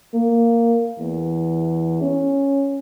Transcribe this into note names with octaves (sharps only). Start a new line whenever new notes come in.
A#3
E2
C#4